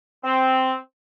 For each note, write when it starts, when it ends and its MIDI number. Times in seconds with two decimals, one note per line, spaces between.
0.24 0.74 60